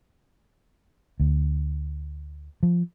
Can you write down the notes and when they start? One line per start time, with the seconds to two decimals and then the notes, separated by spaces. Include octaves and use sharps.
1.20 D2
2.63 F3